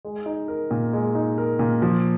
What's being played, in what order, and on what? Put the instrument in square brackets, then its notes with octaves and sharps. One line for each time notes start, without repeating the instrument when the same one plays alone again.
[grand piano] G#3
D#4
A#4
A#2
G#3
D#4
A#4
A#2
F3